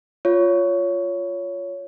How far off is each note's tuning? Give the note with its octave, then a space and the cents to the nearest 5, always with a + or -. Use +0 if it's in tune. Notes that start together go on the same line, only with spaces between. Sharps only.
F4 +0 C#5 +15